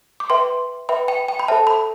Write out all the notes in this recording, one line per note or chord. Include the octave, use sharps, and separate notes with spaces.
D6
B4 E5 G5 C6
B4 E5 G5 B5
G5
G5
B5
A4 C5 E5 G5 A5
B5